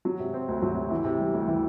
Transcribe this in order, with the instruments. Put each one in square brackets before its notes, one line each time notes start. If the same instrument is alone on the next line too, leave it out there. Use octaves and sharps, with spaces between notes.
[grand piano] F#3
C3
C4
D2
F#3
C3
E3
C3
G3
D2
E3